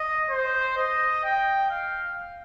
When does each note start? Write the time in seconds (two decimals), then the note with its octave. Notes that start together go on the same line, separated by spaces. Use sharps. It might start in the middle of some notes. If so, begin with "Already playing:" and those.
Already playing: D#5
0.30 C5
0.77 D#5
1.23 G5
1.70 F5